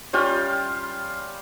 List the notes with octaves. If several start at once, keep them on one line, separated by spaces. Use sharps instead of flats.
G3 C#4 F4 G5